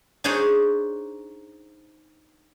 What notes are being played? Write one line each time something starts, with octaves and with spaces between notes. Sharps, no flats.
D4 D#4 G#4 C5 C#5